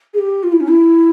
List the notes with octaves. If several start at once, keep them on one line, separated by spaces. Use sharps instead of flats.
G#4
G4
F4
E4
C#4
E4